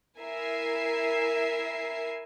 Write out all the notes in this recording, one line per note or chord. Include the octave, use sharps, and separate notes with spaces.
E4 A#4 E5 G#5 C7